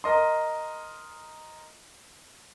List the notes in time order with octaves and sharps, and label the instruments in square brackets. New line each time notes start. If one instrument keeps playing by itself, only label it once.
[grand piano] A#4 D#5 C6